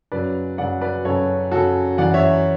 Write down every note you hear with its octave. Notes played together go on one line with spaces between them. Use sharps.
F#2 C#3 F#3 B4 D5
F#2 C#3 F#3 D5 F#5
B4 D5
F#2 C#3 F#3 A4 C#5
F#2 C#3 F#3 F#4 A4
F#2 C#3 E3 D5 F#5
C#5 E5